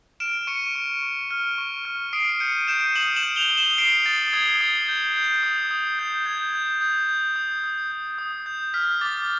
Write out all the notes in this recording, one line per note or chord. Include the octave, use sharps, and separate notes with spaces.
F6 D7 E7
C#6 C#7 D#7
C#6
C#6
F6
C#6
F6
D#6 C7 D7
G6 C#7 D#7
G6 D7 E7
D#6 E7 F#7
E7 F#7
G6
F7 G7
D#6
E7 F#7
D#6 C7 D7
D#6 A6
D#6 G#6
D#6
G6
G6
D#6
D#6
G6
G6 G#6
G6
D#6 G6
D#6 G6
D#6
D#6
G6
D#6
G6
F6 B6
D6 A6